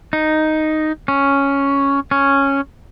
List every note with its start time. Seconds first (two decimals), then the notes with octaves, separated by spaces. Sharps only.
0.13 D#4
1.08 C#4
2.11 C#4